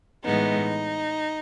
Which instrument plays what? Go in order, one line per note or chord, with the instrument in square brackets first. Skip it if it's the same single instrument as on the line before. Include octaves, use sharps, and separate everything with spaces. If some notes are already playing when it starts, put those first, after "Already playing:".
[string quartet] A2 E3 G#3 B3 D#4